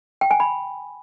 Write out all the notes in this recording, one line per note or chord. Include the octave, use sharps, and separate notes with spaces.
G5
G#5
B5